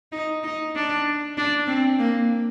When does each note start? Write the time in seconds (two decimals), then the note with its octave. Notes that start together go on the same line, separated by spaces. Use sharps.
0.12 D#4
0.44 D#4
0.75 D4
1.38 D4
1.68 C4
1.99 A#3